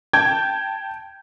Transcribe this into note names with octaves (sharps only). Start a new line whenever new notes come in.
G5 A5 G6 G#6